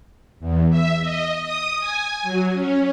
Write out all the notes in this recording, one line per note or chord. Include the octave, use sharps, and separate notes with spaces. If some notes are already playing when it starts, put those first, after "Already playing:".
E2
E5
D#5
D#6
G#5
F#3
C#4